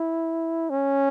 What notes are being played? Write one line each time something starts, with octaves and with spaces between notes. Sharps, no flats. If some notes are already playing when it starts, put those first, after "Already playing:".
Already playing: E4
C#4